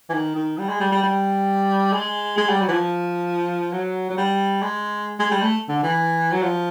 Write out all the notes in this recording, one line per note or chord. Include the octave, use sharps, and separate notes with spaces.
E3
D#3
D#3
G3
G#3
G3
G3
G3
G#3
G#3
G3
F#3
E3
F3
F#3
F#3
G3
G#3
G#3
G3
A3
D3
E3
F#3
F3